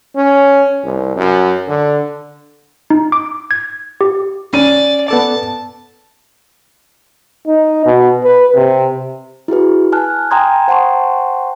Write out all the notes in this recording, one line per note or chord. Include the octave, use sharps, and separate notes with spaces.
C#4
C2
F#2
D3
D#4
D6
G#6
G4
C#4 D5 D#7
B3 A4 D5 A5
D#4
B2
B4
C3
E4 F#4 G#4 B4
G#5 A5 F6 F#6
G5 G#5 A#5 C6 D#6 G#6
C5 F#5 G5 A5 C6 C#6